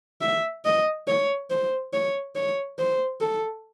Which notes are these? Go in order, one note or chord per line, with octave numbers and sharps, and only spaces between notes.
E5
D#5
C#5
C5
C#5
C#5
C5
A4